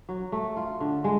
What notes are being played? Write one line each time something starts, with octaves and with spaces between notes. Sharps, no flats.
F#3
A3
F4
D3
G#3